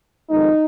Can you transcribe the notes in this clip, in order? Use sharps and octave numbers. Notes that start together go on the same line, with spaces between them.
F2 D#3 G#3 D#4